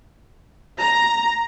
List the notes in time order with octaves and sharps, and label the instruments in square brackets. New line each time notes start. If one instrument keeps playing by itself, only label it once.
[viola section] A#5